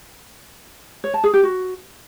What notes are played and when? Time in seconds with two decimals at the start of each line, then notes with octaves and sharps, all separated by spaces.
1.04 C#5
1.14 A5
1.24 G#4
1.34 G4
1.43 F#4